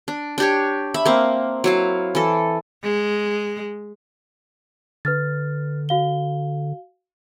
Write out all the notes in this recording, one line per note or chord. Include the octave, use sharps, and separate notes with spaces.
D4
D4 G4 C#5
E5 B5
A#3 C4
F#3 E4 F5
E3 A4
G#3
D3 B4 F6 A6
F#4 F5 G7